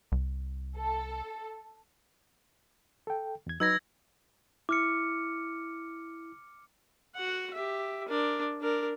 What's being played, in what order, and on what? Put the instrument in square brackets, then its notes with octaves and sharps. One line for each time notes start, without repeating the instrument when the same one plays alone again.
[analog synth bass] C2
[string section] A4
[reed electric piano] A4 G5
E2 G#6
[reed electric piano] F#3 D#4 B4 [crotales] E6 G#6 A#6
[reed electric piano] E4 [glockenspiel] D6 F6 C#7
[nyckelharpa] F#4 F#5
G4 E5
D4 A#4
D4 A#4